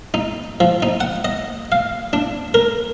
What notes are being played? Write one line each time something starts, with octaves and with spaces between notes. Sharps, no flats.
D#4
F3
D#4
F#5
D#5
F5
D4
A#4